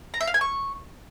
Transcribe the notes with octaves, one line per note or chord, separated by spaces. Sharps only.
A#5
E5
F5
G#5
C#6